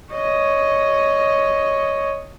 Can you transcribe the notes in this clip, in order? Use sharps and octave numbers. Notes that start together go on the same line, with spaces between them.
C#5 D#5